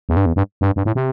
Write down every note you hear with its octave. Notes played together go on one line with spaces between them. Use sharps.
E2
G2
E2
G2
G2
G2
A2
C3